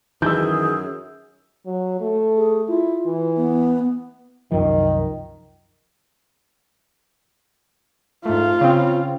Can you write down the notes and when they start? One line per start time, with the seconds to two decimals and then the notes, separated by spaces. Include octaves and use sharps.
0.22 F#2 D#3 E3 G#4 E6 G6
1.66 F#3
2.00 A3
2.37 G#4
2.68 E4 F4
3.06 E3
3.37 B3
4.52 C2 F#2 D#3 F3
8.25 G#2 A3 F4
8.61 C#3 C4